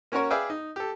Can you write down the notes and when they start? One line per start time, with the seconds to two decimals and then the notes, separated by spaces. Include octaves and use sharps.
0.12 A#3 C#4 F#4 A#4 C#5
0.30 G#4 B4 D5 E5 F5 G5
0.50 D#4
0.76 G4 A4